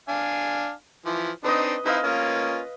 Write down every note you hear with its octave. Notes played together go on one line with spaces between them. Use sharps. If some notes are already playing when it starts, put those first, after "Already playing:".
D4 F5 G#5
E3 F3
C4 D4 D#4 B4 D#5
C4 D#4 E4 B4 D#5 F5
A#3 C#4 F4